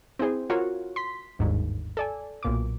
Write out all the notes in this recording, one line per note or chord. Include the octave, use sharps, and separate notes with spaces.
C4 E4 G#4 C5
F4 F#4 A#4 C#5
C6 B6
G1 D#2 G#2
A4 D5 G#5
B1 A#2 D6